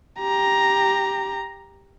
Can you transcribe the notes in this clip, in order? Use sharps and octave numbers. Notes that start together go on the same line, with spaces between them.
G4 A#5